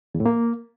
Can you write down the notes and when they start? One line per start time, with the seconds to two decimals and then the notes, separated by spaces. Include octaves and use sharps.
0.15 E2
0.20 A2
0.26 A#3